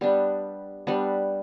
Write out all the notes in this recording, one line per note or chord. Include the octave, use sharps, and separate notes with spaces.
G3 B3 D4
G3 B3 D4